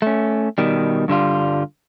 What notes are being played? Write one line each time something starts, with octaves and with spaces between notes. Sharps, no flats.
A3 C#4
B2 D#3 G3
G2 D3 G3 F4